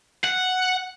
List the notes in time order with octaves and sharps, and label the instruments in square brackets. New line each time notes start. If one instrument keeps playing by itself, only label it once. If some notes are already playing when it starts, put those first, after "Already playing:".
[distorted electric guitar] F#5